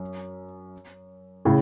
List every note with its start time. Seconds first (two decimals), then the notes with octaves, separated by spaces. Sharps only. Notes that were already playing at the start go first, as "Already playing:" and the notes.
Already playing: F#2
1.45 A2 C#3